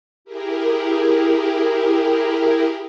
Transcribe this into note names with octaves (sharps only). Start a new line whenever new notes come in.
E4 G4 G#4 A#4